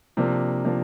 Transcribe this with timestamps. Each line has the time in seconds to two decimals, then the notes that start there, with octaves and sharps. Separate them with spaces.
0.17 C3 F3 A#3 D4
0.64 C3 F3 A#3 D4